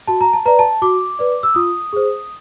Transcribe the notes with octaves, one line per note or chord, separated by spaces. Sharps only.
F#4 A5
A#5
A5
B4 D5 A#5
A5
F#4 D6
B4 D5
E6
F4 D#6
G#4 C5